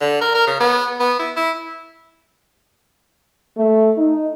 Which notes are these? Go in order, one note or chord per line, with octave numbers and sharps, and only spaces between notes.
D3
A#4
A#4
C#3
B3
B3
E4
E4
A3
D#4